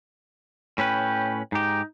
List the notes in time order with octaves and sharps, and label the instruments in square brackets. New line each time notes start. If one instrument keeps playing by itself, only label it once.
[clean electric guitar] A2 C#4 B4 [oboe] G5
[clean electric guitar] G#2 G4 [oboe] D#4